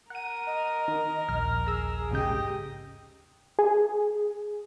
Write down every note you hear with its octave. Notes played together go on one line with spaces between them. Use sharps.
A#4 F#5 D#7
D#5
D#3
A#1 D#2 F6
G#4 A#5 E6
G#2 C#3 G4 D#5 G5
G#4